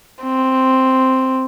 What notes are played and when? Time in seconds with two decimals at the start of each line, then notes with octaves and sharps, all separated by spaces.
0.23 C4